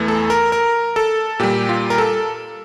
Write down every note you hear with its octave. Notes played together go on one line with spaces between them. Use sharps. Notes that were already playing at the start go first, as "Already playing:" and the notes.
Already playing: E2 E3 A3
A4
A#4
A#4
A4
A#2 G3 G4
F4
A#4
A4